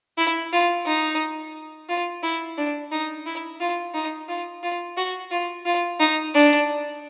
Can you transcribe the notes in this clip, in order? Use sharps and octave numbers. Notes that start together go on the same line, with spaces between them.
E4
F4
D#4
F4
E4
D4
D#4
E4
F4
D#4
F4
F4
F#4
F4
F4
D#4
D4